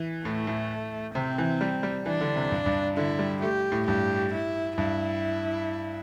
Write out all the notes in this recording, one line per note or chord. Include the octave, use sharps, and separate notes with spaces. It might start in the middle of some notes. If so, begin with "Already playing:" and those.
Already playing: E3
A2 A3
A2
C3 C4
E3
G3
G3
E3 D4
D3
C3
G2
G2
D3 E4
G3
A3 G4
A2
G2 G4
E4
G2 E4